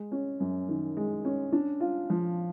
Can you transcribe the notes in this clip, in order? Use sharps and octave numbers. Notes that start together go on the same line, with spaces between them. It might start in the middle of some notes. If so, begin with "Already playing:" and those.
Already playing: G#3
C#4
F#2
D#3
G#3
C#4
D4
F4
F3